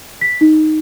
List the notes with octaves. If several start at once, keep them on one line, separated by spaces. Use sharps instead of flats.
B6
D#4